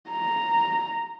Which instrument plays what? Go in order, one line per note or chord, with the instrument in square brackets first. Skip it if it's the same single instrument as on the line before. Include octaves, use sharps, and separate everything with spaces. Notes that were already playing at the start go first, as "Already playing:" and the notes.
[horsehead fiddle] A#5